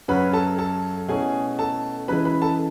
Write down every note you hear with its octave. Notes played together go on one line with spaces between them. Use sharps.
F#2 C#3 F#3 C#4 B4 B5
A4 A5
A4 A5
B2 A3 C#4 E4 G#4 G#5
A4 A5
C#3 E3 G#3 B4 B5
B4 B5
A4 A5